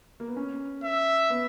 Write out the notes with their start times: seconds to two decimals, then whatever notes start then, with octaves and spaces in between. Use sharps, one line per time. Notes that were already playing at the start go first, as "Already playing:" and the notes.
0.20 A#3
0.28 B3
0.36 C#4
0.84 E5
1.30 B3